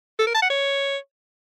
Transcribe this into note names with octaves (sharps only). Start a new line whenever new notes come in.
A4
A#4
A5
F#5
C#5